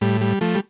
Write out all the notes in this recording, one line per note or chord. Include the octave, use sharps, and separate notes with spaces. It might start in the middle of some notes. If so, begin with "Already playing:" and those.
A2 G3
G3
F3 A3
G3